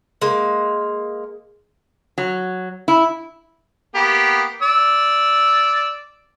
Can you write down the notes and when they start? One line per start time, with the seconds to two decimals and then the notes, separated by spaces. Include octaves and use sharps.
0.22 G#3 A#3
2.18 F#3
2.88 E4
3.95 A#3 B3 G4
4.62 D5 E6